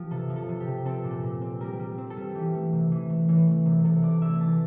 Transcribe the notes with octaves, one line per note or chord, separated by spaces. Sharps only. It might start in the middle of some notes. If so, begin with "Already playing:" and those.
Already playing: F3 G4
C3 A4
F3
A4
C3
G4
C3
C4 A4
A#2
A4
A#2
C4
G3 A#4
G3
C4
A4
G3
E3 G4
A3
C3
E3
A3
E3
A3
C3
C3 A4
A3 D5
A3 E5
E3 A5